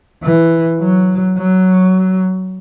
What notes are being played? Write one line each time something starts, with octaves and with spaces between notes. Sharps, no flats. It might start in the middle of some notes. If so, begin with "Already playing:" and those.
E3
F#3
F#3